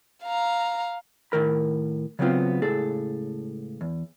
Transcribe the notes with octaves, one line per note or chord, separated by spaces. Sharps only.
F5 A#5
A2 D#3 A#4 B5
C#3 F#3 A3 B3 C4 F4
C#2 A2 G#4 A4
E2